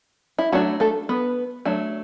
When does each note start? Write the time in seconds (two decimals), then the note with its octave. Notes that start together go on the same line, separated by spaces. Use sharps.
0.38 E4
0.52 F#3 A3 D4 F#4
0.80 A3 A4
1.09 B3 B4
1.65 F#3 A3 D4